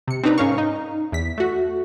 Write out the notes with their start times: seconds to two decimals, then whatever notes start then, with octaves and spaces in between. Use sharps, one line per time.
0.08 C3 C#7
0.23 C4 D4 D#4 B4 A#5
0.38 G#2 C#4 A#4 F5 C#6
0.58 D#4
1.12 E2 B6
1.38 A3 F#4